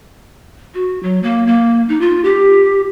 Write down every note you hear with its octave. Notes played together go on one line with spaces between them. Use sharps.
F#4
F#3
A#3
A#3
D#4
F4
G4